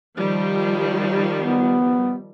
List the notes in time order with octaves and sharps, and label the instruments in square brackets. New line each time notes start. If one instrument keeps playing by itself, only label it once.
[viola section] D#3 F3 G3
[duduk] B3